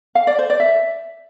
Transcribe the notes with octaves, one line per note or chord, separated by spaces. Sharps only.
F5
D5
C5
D5
E5